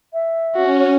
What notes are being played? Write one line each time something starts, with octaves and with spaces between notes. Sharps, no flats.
E5
C#4 F#4